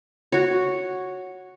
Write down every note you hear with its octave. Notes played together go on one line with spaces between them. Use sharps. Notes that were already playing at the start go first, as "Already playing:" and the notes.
F#4 C#5